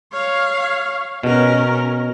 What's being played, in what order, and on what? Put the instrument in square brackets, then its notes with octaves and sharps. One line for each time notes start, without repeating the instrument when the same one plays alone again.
[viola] C#5 F5
[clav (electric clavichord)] B2 [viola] C#4 A#4